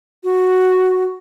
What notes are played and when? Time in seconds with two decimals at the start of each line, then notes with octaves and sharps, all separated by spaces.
0.24 F#4